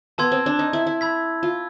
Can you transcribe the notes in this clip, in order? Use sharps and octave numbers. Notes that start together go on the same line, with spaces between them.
B3 A5 C6 E6 G#6
C4
D4
D#4
E4
E4
B5 E6 G#6 B6
F4